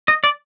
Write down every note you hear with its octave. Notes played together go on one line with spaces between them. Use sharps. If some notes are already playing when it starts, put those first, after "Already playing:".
D#5
D5